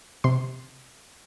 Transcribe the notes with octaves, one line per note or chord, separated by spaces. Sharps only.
C3 C6